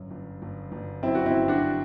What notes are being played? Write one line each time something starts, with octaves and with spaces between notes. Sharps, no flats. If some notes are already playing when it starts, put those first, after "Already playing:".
Already playing: G1 F#2 F#3
G1
G1
G1
F#2 C4 E4
F#4
C4 E4
G1
D4 F#4